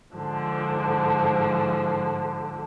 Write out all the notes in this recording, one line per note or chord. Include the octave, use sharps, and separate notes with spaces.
G#2 D3 F3